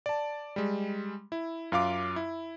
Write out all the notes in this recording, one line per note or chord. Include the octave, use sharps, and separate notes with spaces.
D5 A5
G3 G#3
E4
F#2 F4 F5 D6
E4